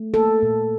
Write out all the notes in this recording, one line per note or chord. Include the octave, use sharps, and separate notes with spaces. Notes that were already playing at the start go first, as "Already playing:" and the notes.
Already playing: A3
A#3 A4
A#2